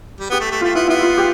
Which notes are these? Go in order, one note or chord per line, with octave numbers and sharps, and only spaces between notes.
G3
B3 G4
A3
A3
A3 F4
B3 E4
B3 E4
F4
G4